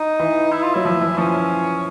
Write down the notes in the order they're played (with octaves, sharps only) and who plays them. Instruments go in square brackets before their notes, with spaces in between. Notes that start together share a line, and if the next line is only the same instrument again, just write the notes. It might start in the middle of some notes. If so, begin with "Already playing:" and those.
Already playing: [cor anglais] D#4
[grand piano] E3
[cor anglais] E4
F4
[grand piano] F#3 [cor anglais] E4
[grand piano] F3
E3
[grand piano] F3 [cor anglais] C#4